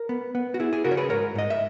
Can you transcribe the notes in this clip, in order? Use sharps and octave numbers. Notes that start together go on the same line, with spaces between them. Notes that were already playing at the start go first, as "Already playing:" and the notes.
Already playing: A#4
B3
B3
F#4
E4 G#4
G#4
C#3 F#4 A#4
C#5
G#4 B4
G#2 A#4 C#5
G#2 D#5
E5